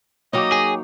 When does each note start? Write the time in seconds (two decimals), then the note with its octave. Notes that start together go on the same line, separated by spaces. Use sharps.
0.33 F#3 A#3 D#4 C#5 D#5 G5 D6
0.52 G#4